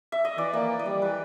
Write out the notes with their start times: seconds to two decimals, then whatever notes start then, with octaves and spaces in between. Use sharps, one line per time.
0.12 E5
0.25 D#5
0.37 E3 D5
0.53 A#3 D5
0.70 E3
0.79 D#5
0.85 G3 D5
1.02 E3 B4